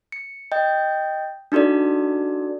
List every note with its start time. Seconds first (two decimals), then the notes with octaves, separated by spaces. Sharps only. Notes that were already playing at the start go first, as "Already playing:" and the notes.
0.12 C#7
0.52 D#5 G5 G6
1.52 D4 D#4 F#4 A4 D5